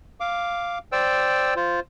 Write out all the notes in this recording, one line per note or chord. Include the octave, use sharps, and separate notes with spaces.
F5 D6
C5 D5 G5 E6
F4 C5